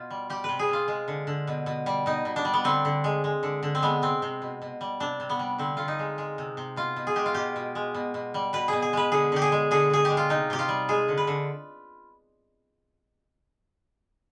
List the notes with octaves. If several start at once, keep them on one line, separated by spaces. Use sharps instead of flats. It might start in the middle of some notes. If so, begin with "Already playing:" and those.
Already playing: B2 F4
G3
G3 G4
C3 B4
G#4
C3 F4
G#3
D3
D3
B2
B2
G3
B2 D#4
B2
D4
G3
B3
D3 C4
D3
G#3
G#3
D3
D3
C4
G#3 B3
C3 C4
C3
B2
B2
G3
C3 D4
C3
B3
G3
D3 C4
D3 F4
D#4
G#3
G#3
C3
C3
B2 F4
B2
G#4
G#3 G4
F4
B2 G4
B2
G#3
B2
B2
G3
B2 B4
B2 G#4
G#4
G#3 B4
D3 G#4
D3 G4
G#4
G#3
D3 G#4
D3 G#4
G4
G#3
F4
C3 D#4
C3 G4
F4
G3
G#3 G#4
D3
B4
D3